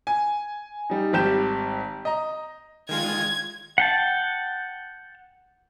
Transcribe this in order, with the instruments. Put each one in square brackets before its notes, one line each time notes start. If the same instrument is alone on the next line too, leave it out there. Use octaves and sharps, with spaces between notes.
[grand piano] G#5
G3 D#4
G#1 G3 G4 G6 E7
D#5 A#5
[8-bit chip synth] D#3 G#3 F4 [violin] G#6
[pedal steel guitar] F#5 G5 A5